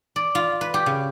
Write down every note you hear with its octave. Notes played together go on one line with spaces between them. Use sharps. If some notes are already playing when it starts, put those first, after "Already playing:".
D5
F4
B4
G4
C#3